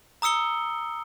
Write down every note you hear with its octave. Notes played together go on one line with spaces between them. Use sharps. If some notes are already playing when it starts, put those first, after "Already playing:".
A#5 D#6 E6 C#7 G7